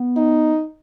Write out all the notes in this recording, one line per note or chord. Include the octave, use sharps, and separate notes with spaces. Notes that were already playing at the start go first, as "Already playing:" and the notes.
Already playing: B3
D#4